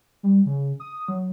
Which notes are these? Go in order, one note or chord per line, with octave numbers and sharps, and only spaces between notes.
G3
C#3
D#6
F#3